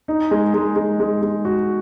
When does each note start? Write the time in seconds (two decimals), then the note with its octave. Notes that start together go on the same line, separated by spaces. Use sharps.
0.08 D#4
0.31 G#3
0.54 G#3
0.76 G#3
1.00 G#3
1.22 G#3
1.45 F#4